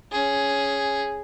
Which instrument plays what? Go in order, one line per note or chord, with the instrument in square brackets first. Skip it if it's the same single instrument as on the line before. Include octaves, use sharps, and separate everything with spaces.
[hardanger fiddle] C#4 G#4